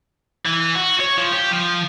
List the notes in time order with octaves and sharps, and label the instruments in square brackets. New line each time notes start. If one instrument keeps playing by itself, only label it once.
[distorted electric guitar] E3
F#4
C#5
F3
G4
F3